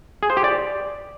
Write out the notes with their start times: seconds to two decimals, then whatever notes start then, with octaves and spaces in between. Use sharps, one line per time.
0.23 G#4
0.30 C5
0.37 G4
0.44 D5